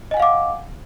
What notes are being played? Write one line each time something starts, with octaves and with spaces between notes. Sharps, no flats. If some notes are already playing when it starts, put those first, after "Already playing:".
D#5 F5 F#5 G#5 D6